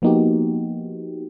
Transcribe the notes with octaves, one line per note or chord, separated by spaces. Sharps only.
F3 A#3 B3 D#4 F#4 G4